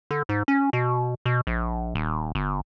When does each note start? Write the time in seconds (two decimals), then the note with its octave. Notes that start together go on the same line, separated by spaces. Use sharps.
0.11 D3
0.29 G#2
0.48 C#4
0.73 B2
1.26 B2
1.47 A#1
1.95 D#1
2.35 G1